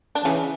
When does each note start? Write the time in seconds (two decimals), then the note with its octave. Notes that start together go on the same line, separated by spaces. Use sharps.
0.15 D4
0.24 C#3 E3 C#4